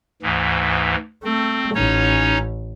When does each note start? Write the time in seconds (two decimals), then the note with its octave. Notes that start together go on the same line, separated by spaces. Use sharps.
0.22 D2 G#2 E3
1.24 A3 C4
1.75 A1 C#4 D#4 C#5